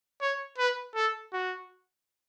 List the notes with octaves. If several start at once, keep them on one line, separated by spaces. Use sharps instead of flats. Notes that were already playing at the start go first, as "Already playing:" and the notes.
C#5
B4
A4
F#4